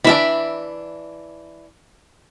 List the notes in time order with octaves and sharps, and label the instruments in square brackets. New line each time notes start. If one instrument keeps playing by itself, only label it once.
[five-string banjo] E3 D4 [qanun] E5 B5